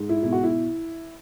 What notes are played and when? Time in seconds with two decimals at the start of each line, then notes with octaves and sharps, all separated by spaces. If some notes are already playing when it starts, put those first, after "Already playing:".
Already playing: G#2
0.09 E4
0.23 B2 E4
0.32 F#4
0.43 E4